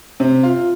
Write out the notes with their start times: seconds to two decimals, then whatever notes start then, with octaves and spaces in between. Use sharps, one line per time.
0.20 C3
0.43 F4